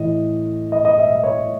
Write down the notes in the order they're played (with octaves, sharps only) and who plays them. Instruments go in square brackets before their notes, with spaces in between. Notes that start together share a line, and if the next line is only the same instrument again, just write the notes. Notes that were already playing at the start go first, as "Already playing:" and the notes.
Already playing: [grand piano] A2 E3 D#5
D#5
D#5
E5
D#5
C#5